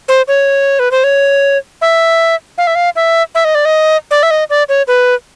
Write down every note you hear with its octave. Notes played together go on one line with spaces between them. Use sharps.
C5
C#5
B4
C5
C#5
E5
F5
E5
F5
E5
E5
D#5
D5
D#5
D5
E5
D#5
D5
C#5
B4